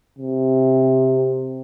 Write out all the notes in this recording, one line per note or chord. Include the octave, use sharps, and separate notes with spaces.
C3